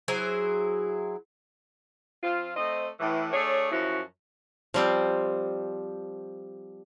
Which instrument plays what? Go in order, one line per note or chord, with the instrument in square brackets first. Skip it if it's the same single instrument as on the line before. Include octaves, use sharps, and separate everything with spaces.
[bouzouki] F#3 E4 G#4 C5
[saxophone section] F3 C4 F4
A3 C4 C5 D#5
A2 E3
A3 D4 G#4 C#5
F#2 F3 C#4 E4 F#4
[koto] F3 G3 C4